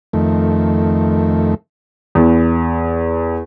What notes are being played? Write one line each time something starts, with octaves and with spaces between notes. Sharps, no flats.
F2 D#3 A3
E2